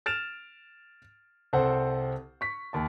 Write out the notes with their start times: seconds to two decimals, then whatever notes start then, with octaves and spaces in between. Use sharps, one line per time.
0.06 F6 A6 D7 E7 F7
1.53 C2 C4 A4 C5 F#5
2.41 C#6 B6
2.73 D#2 A5